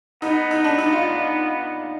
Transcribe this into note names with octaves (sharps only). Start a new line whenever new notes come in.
B3 D#4
D#4
D4
D#4
F4